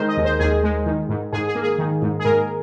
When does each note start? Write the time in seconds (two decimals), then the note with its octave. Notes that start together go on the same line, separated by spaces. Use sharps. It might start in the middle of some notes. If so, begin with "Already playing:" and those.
Already playing: D#3 G#3 G#4 A#4 C5
0.09 D#5
0.17 D#2
0.25 C5
0.39 D#2 G#4
0.63 G#3
0.86 D#3
1.09 G#2
1.33 G#2 G#4
1.48 G#4
1.55 A#3
1.63 G#4
1.79 D#3
2.02 G#2
2.20 G#4
2.25 G#2 A#4